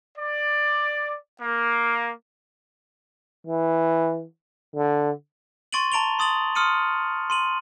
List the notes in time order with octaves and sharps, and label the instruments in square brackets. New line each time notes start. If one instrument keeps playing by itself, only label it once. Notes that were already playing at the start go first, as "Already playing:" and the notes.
[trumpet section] D5
A#3
[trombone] E3
D3
[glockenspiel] C6 C#6 A6 D7 D#7 F#7
A5 A#5 D7 F7 G7
C6 D#6 A6 F#7
C6 D#6 F6 C#7 D#7
C6 D#7 F#7